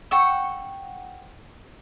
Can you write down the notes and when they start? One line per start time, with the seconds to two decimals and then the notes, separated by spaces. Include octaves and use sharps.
0.11 F#5 G5 C#6 E6